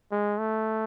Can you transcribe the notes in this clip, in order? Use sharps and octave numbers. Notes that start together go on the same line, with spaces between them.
G#3
A3